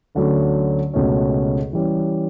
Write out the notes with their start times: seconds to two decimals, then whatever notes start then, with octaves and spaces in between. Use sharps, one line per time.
0.15 D2 D3 F#3 C#4
0.94 C#2 B2 A3 C#4
1.73 E3 G3 C#4